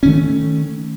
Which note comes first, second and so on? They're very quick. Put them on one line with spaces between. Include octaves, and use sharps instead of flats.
C#4 D#3 A3